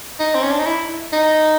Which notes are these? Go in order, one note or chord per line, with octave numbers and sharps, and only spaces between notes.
D#4
C4
C#4
D4
D#4
E4
D#4